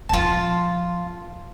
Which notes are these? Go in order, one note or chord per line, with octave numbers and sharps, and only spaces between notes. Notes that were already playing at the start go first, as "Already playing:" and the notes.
A#2 F3 F4 A5